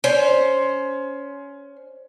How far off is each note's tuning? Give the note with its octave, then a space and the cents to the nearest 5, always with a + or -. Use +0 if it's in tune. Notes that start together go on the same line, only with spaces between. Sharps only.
C#4 +20 C5 +5